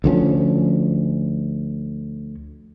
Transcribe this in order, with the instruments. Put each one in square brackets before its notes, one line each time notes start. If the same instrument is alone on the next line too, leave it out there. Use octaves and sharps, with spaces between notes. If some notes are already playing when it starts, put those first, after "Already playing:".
[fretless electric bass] D2 F3 B3 C#4